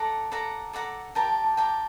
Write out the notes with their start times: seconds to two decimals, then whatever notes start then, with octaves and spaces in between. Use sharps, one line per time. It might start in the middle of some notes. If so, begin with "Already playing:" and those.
Already playing: A4 D5 F#5 A5 A#5
0.32 A4 D5 F#5 A#5
0.73 A4 D5 F#5 A#5
1.15 G4 A#4 D5 G5 A5
1.29 A5
1.44 A5
1.57 G4 A#4 D5 G5 A5